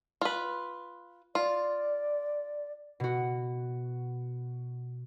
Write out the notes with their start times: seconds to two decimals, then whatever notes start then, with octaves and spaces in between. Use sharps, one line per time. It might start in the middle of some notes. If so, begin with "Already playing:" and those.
0.21 F4 B4
1.35 F4 D5
3.00 B2 F#4